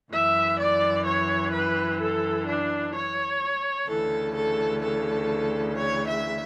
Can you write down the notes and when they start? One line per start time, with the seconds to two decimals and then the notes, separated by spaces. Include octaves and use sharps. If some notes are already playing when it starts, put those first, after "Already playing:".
0.12 F#2 E3 E5
0.59 D5
1.05 C#5
1.52 B4
1.99 A4
2.46 D4
2.94 C#5
3.88 D2 C#3 E3 A4
4.35 A4
4.83 A4
5.78 C#5
6.08 E5